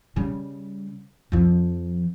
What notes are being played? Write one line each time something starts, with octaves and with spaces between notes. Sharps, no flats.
C#3 G3
F2 F3